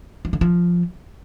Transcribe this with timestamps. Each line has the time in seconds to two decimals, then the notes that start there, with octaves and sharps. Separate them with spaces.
0.25 F3
0.33 D3
0.41 F3